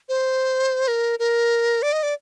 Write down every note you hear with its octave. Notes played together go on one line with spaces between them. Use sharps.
C5
A#4
A#4
D5
D#5
D5